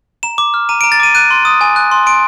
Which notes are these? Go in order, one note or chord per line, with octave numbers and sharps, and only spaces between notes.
A#5 E7
D6
F6
A#5 D#7
A#5 D7
A6
D6 D#7
F#6 D#7
C6
D#6
G#5
F#6
C6
C6 D7